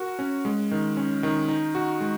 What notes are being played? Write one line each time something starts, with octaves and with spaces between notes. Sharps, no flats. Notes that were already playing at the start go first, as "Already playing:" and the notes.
Already playing: F#4 A#4
C#4
G#3
D#3
C#4
D#3
D#4
F#4
G#3